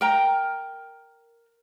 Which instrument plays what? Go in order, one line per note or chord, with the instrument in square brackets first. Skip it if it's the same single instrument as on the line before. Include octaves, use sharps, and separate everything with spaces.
[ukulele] A#4 G5 A#5